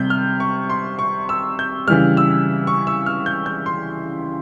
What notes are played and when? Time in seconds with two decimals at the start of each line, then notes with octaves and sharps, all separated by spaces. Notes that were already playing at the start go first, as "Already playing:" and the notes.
Already playing: C3 G3 G6
0.10 F6
0.40 C#6
0.70 C6
0.99 C#6
1.29 E6
1.59 G6
1.88 C#3 E3 G3 F6
2.17 E6
2.67 C#6
2.87 E6
3.06 F6
3.26 G6
3.46 G6
3.66 C6